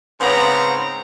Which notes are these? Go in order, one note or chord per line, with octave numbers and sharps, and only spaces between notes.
G#2 C#3 B3 C4 A#5